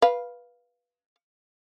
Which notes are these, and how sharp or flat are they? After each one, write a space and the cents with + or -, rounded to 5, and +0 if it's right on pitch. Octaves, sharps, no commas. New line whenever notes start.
B4 -15 F5 +0